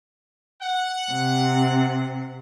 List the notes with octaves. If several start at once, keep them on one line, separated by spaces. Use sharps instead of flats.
F#5
C3